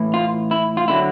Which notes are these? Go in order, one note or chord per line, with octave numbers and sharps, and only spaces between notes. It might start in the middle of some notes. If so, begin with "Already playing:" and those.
Already playing: A2 E3
F4
E4
F4
D3 F#3 E4